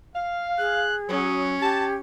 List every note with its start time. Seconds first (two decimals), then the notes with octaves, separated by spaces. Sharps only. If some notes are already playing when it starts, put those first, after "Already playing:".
0.14 F5
0.59 G#4 F#6
1.09 F#3 C#4 D#6
1.60 G4 A5 G#6